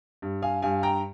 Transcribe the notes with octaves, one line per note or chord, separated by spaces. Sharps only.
G2
F5 G#5
G2 F5 G#5
G5 A#5